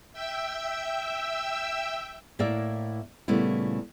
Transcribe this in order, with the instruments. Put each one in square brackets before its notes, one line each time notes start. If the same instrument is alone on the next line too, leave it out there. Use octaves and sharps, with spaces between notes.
[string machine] E5 G5 E6
[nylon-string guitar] A2 A#3 E4 A#4 D5 E5
A#2 C#3 G3 A3 B3 E4